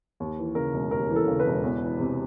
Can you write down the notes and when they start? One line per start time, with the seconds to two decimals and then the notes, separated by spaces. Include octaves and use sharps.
0.20 D#2
0.38 E3
0.55 C#3 A#4
0.74 E1
0.91 D#2 A#4
1.09 E3
1.16 A4
1.28 C#3
1.40 B4
1.46 E1
1.63 E2
1.82 E3
2.00 C3